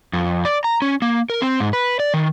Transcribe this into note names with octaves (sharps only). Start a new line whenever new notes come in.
F2
D5
A#5
C#4
A#3
A#4
C4
G#2
B4
D5
D#3